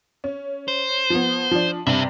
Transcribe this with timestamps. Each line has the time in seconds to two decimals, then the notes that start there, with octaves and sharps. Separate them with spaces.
0.24 C#4
0.68 C5
1.10 F3 B3
1.51 F3 D4
1.87 G2 C3 C5 E5 F#7